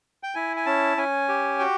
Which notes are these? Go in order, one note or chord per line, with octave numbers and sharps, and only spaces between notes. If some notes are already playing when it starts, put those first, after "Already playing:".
G5
E4 G#5
G#5
C#4 A5
C#4 G#5
G4
F#4 G5